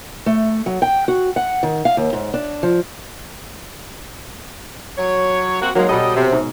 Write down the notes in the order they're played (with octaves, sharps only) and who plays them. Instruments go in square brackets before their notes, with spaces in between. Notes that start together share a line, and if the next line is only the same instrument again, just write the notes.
[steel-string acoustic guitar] A3
F#3
G5
F#4
F#5
D#3
F5
D#2
G#2
D4
F3
[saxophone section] F#3 C#5
A#3 C4 F#4
[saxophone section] D#3 G#3 A#3 [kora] F#3
[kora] B2 B3 A4 [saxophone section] G3 D#5
[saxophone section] C3
[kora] G#2